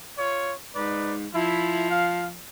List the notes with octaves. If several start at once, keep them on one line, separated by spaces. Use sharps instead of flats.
F4 C#5
G#2 D#4 B4 D5
F3 E4
F5